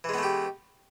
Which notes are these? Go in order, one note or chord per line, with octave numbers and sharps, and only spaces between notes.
E3 G#3 A3 B3 G4